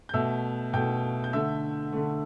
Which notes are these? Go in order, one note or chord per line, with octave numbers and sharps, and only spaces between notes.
G6
B2 A3 E5 E6
B2 A3 G5 G6
G6
D3 A3 E5 E6
D3 A3